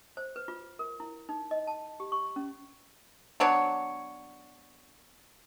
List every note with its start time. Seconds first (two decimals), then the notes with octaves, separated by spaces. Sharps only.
0.17 C5
0.36 B4
0.48 F4
0.79 A#4
1.00 E4
1.29 D#4
1.51 D#5
1.67 A5
2.00 G4
2.12 C#6
2.36 C#4
3.40 F#3 B3 D4 C#5